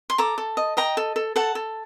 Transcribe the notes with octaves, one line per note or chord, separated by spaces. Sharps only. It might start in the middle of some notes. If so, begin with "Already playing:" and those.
C6
A4 A#5 D6
A4
D#5
D#5 G5 A#5
A4
A4
A4 F#5 A5
A4